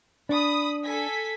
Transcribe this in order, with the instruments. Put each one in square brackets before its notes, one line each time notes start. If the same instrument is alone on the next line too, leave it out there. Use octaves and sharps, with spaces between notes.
[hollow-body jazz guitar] D4 [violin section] B5 D#6
[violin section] A4 G#5 B6